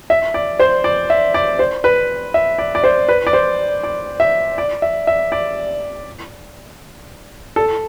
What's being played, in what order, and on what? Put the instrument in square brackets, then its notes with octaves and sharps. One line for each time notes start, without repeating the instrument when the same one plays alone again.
[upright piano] E5
D5
C5
D5
E5
D5
C5
B4
E5
D5
D5
C5
B4
D5
C5
D5
E5
D5
E5
E5
D5
A4